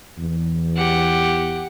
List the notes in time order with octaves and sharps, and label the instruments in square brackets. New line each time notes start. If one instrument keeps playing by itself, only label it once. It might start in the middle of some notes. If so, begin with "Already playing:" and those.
[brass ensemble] E2
[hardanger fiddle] G4 F#5